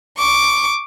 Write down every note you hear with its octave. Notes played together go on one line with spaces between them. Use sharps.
C#6 D6